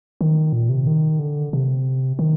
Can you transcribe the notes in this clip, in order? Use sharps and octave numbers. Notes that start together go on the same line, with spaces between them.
D#3
A#2
C3
D#3
D3
C3
D#3